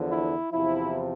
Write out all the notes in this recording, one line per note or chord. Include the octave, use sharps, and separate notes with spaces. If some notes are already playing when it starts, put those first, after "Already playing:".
Already playing: E2 D3 F3
E4
E2 C3 F3 E4